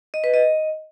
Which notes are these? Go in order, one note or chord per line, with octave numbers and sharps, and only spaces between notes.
D#5
B4
D#5